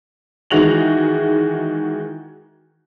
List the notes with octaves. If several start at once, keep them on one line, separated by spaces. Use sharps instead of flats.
D#3 E3 G#3 F#4 F7 F#7